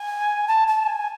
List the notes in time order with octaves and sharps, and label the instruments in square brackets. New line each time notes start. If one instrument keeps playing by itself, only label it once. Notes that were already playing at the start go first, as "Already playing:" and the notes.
Already playing: [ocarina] G#5
A5
A5
G#5